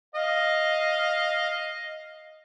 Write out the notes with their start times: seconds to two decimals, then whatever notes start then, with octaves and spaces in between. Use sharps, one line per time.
0.15 D#5 F5